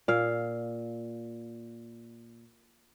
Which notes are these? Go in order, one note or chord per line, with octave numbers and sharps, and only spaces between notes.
A#2 F5